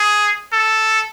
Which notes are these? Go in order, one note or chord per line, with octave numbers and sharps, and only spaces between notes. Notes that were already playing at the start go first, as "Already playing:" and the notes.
Already playing: G#4
A4